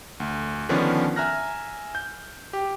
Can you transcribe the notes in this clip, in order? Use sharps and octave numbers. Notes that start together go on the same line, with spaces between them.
D2
D3 D#3 F3 B3 C#4 D4
E5 G#5 A#5 F6 F#6 A#6
G6
G4